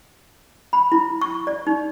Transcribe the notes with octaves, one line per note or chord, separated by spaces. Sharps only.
B5
E4
C#6
D5
D#4